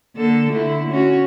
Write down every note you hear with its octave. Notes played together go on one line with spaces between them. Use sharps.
D3 A#3 A4
D3 A3 E4
C#4 F#4